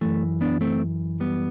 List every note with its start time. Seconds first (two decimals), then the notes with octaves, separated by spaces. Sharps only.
0.01 F#2 E3 A3
0.41 B3 D4
0.61 A3 C4
1.20 G3 B3